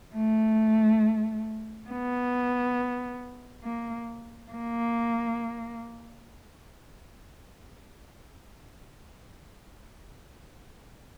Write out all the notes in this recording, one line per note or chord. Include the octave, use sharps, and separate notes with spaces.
A3
B3
A#3
A#3